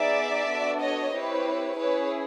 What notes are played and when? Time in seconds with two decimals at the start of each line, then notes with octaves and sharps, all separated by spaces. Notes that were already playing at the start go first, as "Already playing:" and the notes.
Already playing: B3 D#4 G#4 D5 E5
0.49 B3 D4 F#4 A4
0.81 C#5 D#5
1.13 C4 E4 G4 B4 C#5
1.78 C#4 E4 G#4 B4 C#5